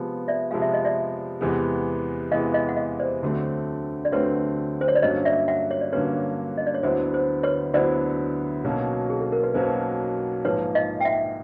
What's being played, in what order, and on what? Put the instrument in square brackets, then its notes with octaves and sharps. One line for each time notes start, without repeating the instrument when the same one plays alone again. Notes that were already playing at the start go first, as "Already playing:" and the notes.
Already playing: [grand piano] C3 F3 G#3 B3
[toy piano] D5 E5
[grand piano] C3 F3 G#3 B3 [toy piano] F5
[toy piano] E5
D#5
D5 E5
[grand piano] E2 C3 E3 G#3 B3
[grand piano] E2 C3 E3 G#3 B3 [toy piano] D#5 F5
[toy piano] D#5 F5
F#5
D#5 F5
C5 D5
[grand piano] D2 D3 F#3 A3 C4
[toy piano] D5
[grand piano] D2 D3 F#3 A3 C4 [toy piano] B4 C#5
[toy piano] C5
C#5
D5
[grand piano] G2 D3 F#3 A#3 C#4 [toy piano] C#5 D#5
[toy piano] D5 E5
E5 F#5
C#5
D5
[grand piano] G2 D3 F#3 A#3 C#4 [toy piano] B4 C#5
[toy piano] D#5
D5
C#5
[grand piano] D2 D3 F#3 B3 E4 [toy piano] C5
[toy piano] C5
B4 C#5
[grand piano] D2 D3 F#3 B3 E4 [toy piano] C5 D5
[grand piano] B1 B2 F#3 A#3 C#4
[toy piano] G#4
A4
A#4
B4
[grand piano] B1 B2 F#3 A#3 C#4 [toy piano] C5
[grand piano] A#1 G#2 F3 A#3 [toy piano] B4 C#5
[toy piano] D#5 F5
G5
E5 F#5